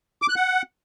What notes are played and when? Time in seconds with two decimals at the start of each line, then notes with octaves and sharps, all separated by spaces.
0.22 D6
0.29 F#6
0.36 F#5